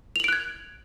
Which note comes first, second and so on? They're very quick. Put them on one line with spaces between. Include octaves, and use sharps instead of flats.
F7 F#7 D7 F#6 G#6